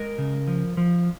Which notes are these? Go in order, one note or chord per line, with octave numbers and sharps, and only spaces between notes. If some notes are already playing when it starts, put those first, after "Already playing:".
Already playing: G#3 A#4 D#5
C#3
F3
F3